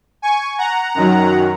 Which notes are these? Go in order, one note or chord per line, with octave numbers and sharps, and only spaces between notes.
G#5 C#6
F#5 A#5
F#2 D#3 F#3